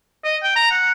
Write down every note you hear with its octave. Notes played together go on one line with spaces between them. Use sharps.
D#5
G5
A#5
F#5